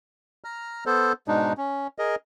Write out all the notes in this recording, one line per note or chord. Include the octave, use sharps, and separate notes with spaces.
A#5 F6
B3 A4 C5
G#2 B2 G#3 D4 D#4
C#4
G#4 A#4 D#5